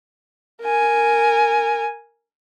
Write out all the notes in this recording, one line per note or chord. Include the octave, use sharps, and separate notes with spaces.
A#4 G#5